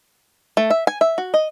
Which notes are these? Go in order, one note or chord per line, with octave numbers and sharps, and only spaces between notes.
A3
E5
G#5
E5
F#4
D#5